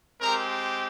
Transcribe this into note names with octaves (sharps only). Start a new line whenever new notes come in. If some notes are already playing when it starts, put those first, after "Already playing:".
G#3 C4 G4 A#4 A#5